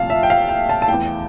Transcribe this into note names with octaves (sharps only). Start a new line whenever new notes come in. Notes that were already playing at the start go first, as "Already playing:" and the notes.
Already playing: C2 A#2 F3 A3 F5 A5
E5
G5
F5
G5
A5
A5
E2 E3 A3 G5